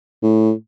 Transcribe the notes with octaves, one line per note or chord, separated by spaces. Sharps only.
A2